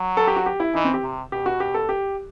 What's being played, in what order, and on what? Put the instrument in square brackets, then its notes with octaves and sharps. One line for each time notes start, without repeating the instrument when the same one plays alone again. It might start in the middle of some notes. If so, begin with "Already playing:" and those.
Already playing: [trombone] F#3
[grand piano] A4
G4
F#4
G4
E4
[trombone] E3 [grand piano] D#4
[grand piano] C4
G4
[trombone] C3
[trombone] B2 [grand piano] G4
[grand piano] F#4
G4
A4
G4